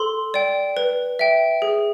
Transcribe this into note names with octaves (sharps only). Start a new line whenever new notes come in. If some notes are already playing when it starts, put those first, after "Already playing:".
Already playing: A4 C6
D5 G5
B4
E5 G5
G#4